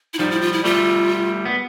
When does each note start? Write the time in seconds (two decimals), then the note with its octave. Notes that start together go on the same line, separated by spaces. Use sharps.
0.14 E4
0.19 F3 G3 D#4
0.31 E4
0.41 F4
0.53 E4
0.64 G3 A3 F4
1.45 B3